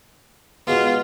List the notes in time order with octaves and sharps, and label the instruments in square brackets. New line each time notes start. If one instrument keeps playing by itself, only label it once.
[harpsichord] B2 G#3 B3 [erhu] F4